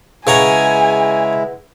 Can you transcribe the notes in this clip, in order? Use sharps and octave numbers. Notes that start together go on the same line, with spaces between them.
C#3 G#3 E4 B4 C#5 F#5 G#5 A#5